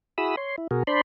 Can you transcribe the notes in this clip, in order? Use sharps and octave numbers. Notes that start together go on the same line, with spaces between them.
E4 F#4 G#4 B5 D#6 E6
C#5 C6
E4
B2 F#4 G#4 A#4
D4 C5 D5 B5 C6